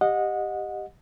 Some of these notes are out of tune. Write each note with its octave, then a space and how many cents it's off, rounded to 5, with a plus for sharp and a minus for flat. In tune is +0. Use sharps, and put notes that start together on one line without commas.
G4 +0 D#5 -10 F#5 -25